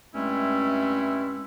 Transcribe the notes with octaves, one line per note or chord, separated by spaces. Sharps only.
G2 G#3 A3 C4 C#4 E4